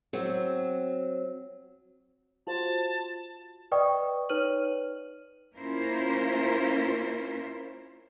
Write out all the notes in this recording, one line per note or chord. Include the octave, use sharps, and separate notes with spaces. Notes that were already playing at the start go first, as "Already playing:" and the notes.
F#3 C4
F4 F#4 C5 A5
B4 D5 D#5 G5 C#6 D#6
D#4 B4 C#5 F6 D#7 F#7
A#3 C#4 E4 F4 A#4 C5